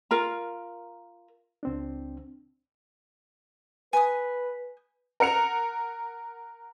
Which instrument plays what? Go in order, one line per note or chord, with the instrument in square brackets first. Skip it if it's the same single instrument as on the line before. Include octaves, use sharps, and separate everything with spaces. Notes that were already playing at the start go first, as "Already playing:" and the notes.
[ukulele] F4 A#4 A#5
[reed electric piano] C#2 C4 D4
[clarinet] B4 [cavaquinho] G#5 D#6
[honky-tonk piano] A#4 F#5 C#7 F7